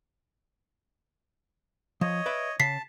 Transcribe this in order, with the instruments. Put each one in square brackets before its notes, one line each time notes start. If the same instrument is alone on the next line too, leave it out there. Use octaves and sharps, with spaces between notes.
[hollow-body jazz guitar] F3 [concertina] C#5 D#5
[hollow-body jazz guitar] B4 D5 E5
[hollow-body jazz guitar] C#3 [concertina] A5 [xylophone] B6 C7